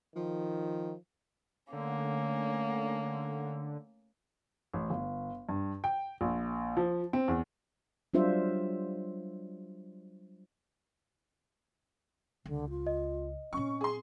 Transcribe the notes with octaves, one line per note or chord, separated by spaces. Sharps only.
D#3 F3
D3 A3 A#3 C#4
A1
G1
G2
G5
A#1
F3
C4
E2
F#3 G3 D4 F4 C5 E5
C#2 D3
F4
D#5
A#2 C4 C#4 C#6
G#4 C6